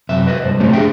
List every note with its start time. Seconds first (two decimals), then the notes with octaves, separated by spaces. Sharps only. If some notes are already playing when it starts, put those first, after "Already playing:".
0.09 F#2 C3 E5
0.27 B4 D#5 E5
0.44 C2 G2 C5
0.60 G2 C3 G3 A3 C4 C#4
0.73 D4 F4 G#4 A4 E5 G5